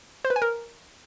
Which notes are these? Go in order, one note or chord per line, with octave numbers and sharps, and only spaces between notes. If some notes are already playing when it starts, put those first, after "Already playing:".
C5
B4
G#5
A#4